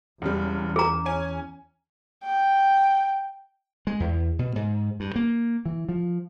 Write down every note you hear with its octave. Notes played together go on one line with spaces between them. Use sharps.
E1 E2 C#3 G3
C#3 G#4 A#5
C#4 G#5
G5
G#3
E2
B2
G#2
G2
A#3
E3
F3